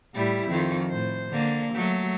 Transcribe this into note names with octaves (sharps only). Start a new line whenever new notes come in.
A2 G3 E4
F2 D#3
A2 C5
D3 A#3
F#3 A3